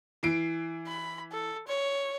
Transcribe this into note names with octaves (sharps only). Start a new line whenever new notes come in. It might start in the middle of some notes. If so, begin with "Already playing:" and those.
E3 C7 D7
B5
A4
C#5